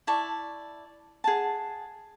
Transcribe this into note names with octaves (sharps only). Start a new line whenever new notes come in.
E4 D5 A5 C#6
G#4 F#5 A5